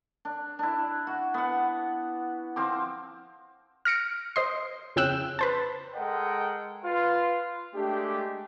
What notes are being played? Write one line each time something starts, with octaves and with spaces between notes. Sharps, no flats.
D4
D4 E4
F#4
B3 F#5
F3 C4 D6
F6 A#6 C#7 D7
C5 D#5 C6
F2 C#3 G5 E6 F#6
B4 C5 A5
G#3 A4 A#4 D#5 F#5 G5
F4 B4 C6
G#3 A3 D4 G4